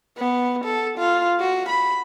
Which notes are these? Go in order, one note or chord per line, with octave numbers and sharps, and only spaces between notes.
B3
A4
F4
F#4
B5